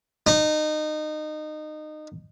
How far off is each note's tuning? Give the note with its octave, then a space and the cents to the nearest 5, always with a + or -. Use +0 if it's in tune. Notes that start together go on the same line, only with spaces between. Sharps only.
D#4 -25